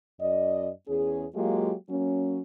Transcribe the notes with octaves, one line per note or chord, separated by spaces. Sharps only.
F#2 D5 D#5
E2 C#4 G#4
F#3 G#3 A#3 F4 G4
F#3 A#3 C#4